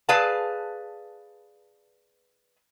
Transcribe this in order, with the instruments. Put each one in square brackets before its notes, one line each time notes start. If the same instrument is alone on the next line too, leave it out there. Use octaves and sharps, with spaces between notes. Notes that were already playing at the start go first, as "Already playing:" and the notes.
[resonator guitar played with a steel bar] G#4 B4 D5 F5 A5